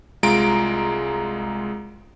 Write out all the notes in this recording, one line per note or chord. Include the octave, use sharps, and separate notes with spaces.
C2 G#3 F4 A#5 D7